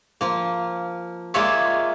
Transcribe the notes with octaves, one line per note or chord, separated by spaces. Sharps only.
F3 A#3
G#3 A#3 F4 C#5 D5 E5